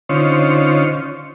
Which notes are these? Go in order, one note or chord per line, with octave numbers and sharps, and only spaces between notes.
D3 C#4 D#4 F4 C5 C#5